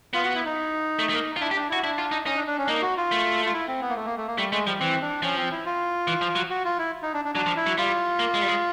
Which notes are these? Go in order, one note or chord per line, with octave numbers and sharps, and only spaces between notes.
B3 F4
F#4
E4
D#4
A3
A3
A#3
F4
D4 E4
G4
D4
E4 F#4
D4 E4
F4
D#4
C#4 D#4
D4
D4
C#4
D4
A#3 D#4
F#4
F4
A3
F4
E4
C4
B3
A#3
A3
A#3
A3
A#3
G3 A3
G#3 A3
F3 G3
E3 C4
D4
F3 C#4
C4
E4
F4
E3
F3
F#3
F#4
F4
E4
D#4
D4
D4
F#3 D4
F3
E4
F#3
G3 F4
A#3
G#3
G3
G#3